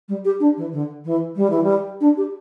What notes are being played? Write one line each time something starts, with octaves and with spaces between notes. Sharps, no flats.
G3
G4
D4
E3
D3
E3
G3
E3
G3
D4
G4